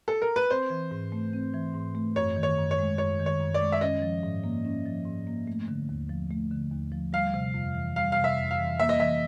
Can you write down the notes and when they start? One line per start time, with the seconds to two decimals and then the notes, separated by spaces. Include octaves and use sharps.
0.08 A4
0.22 A#4
0.36 B4
0.50 C4 C5
0.70 E3
0.91 G#2
1.12 A3
1.33 C4
1.54 E3
1.74 G#2
1.95 A3
2.16 F#2 C#5
2.36 D#3
2.43 C#5
2.58 F#2
2.71 C#5
2.78 G#3
2.98 F#2 C#5
3.20 D#3
3.26 C#5
3.40 F#2
3.54 D5
3.61 G#3
3.72 E5
3.81 C#4 D#5
4.02 F3
4.23 G#2
4.44 A#3
4.65 C#4
4.86 F3
5.05 G#2
5.27 A#3
5.47 A3
5.68 D3
5.89 D#2
6.09 F3
6.31 A3
6.51 D3
6.72 D#2
6.92 F3
7.13 G3 F5
7.34 C3
7.54 F2
7.75 E3
7.96 G3 F5
8.12 F5
8.17 C3
8.24 E5
8.37 F2
8.51 F5
8.58 E3
8.79 A#3 E5
8.89 D#5
9.00 E3 E5